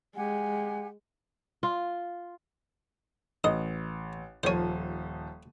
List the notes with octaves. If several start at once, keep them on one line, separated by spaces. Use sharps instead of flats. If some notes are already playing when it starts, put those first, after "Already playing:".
G#3 G4 F#5 G#5
F4
A1 D#5
D#1 F3 C5 C#5 D#7